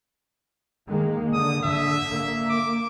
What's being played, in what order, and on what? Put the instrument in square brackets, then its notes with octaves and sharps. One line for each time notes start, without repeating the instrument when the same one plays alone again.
[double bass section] D#3 G#3 A#3
[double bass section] D3 [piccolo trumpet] D#6
[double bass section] D3 [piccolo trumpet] E5
[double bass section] A#3
[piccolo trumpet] D6